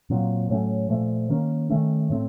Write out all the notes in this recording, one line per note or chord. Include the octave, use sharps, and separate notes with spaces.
A#2 F#3 C4
A2 F#3 A3 C#4
A#2 F3 A3
D#3 A#3 C#4
D#3 A3 C#4
A2 A3 C4